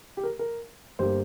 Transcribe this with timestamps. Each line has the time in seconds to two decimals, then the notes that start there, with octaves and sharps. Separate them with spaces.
0.17 G4
0.24 A#4
0.39 A#4
0.99 G1 G3 A#3 G4 C5